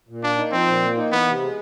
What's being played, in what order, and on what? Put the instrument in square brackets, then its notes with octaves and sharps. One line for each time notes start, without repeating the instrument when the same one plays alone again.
[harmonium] A#2
[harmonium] A#3 [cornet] D4
[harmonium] D#4
[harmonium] F3 [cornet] C4
[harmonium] A#2
A#3
D#4
[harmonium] E3 [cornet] B3
[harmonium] C3
G#3